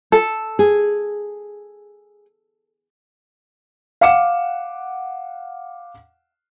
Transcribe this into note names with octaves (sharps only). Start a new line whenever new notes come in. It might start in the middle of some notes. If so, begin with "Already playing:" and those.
A4
G#4
F5 F#5 D6 C#7 E7